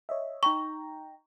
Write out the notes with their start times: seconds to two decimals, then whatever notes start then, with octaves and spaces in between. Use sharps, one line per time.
0.09 C#5 D#5 E5
0.43 D#4 G5 A#5 C#6